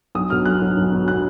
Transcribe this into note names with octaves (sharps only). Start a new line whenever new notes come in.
B1 D#6
B2 F#3 F6
B1 F#6
B2 F#3
B1
B2 F#3
F#6